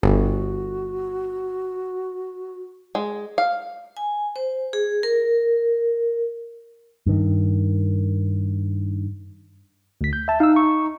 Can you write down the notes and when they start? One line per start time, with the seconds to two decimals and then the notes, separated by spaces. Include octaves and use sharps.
0.03 G1 F#4
2.95 G#3
3.38 F5
3.97 G#5
4.36 C5
4.73 G#4
5.03 A#4
7.06 G2 D#3
10.01 D2 B6
10.13 G6
10.28 E5 A5
10.40 D#4 F5 E6
10.56 C#6